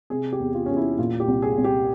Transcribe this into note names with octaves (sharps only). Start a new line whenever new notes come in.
C3 G#4
G4
E2
F4
E2 C#4
E4
A#2 F4
G4
C2
G#4
C2
G4